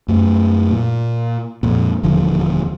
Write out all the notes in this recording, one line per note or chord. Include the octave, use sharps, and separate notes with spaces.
F#2 A3
A#2
F2 A#2
D#1 E2 D3 F3